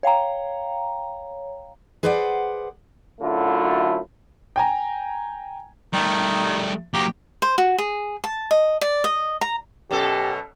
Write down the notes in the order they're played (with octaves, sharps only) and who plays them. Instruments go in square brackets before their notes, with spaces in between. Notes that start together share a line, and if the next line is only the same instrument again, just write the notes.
[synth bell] C#5 F5 G5 A#5
[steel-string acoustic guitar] G#4 B4 C5 D5 F5 F#5
[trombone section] F#2 D3 F#3 A3 E4 F4
[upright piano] G5 G#5 A#5
[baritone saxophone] D#3 [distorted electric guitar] G3 A3
[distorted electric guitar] F#3 A#3 [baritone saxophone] G4
[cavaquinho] C5
F#4
G#4
A5
D#5
D5
D#5
A#5
[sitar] F#2 B2 A4 [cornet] G4